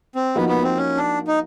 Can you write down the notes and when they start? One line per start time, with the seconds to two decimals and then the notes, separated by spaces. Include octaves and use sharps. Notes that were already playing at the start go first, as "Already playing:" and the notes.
0.15 C4
0.35 F3 A#3 B3 D#4 F#4
0.49 B3
0.63 C4
0.77 C#4
0.97 D4
1.27 D#4